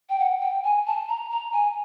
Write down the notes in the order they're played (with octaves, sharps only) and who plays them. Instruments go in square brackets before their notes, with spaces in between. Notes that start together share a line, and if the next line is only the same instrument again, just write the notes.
[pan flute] G5
F#5
G5
G#5
A5
A#5
A#5
G#5